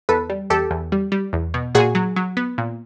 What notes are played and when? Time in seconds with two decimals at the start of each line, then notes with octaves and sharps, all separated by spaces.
0.09 E2 A4 B4
0.30 G3
0.50 E2 G4 A4
0.71 E2
0.92 G3
1.12 G3
1.33 E2
1.54 B2
1.75 A#2 F#4 G#4
1.95 F#3
2.16 F#3
2.37 B3
2.58 A#2